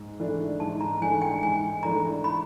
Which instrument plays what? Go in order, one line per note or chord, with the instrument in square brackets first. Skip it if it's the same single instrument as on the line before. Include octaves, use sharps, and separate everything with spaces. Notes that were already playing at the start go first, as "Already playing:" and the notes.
Already playing: [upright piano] G#2
E3 A3 D4
[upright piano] G#2 [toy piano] A5
[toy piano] A#5
[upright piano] E3 A3 D4 [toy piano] G#5
[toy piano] G5
[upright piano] G#2 [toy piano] G#5
[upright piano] E3 A3 D4 [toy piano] A#5
[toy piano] B5